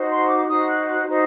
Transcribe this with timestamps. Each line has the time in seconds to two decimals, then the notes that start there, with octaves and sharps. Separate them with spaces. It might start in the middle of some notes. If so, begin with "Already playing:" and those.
Already playing: D#4 F#4 C5
0.09 C6
0.28 D6
0.48 D#4 F#4 C5 D#6
0.68 F#6
0.86 F#6
1.06 D#4 F#4 C5